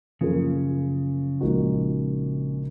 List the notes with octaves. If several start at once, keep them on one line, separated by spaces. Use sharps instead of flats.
F#2 C#3 F3 A#3 F4 G#4
A#1 A#2 G#3 D#4 F#4